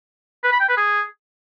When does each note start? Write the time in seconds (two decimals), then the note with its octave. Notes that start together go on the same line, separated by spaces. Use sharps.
0.43 B4
0.52 B5
0.60 G5
0.69 B4
0.77 G#4